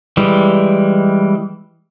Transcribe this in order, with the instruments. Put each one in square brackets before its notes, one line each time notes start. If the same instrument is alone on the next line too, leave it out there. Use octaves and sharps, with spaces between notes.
[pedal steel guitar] E3 G3 G#3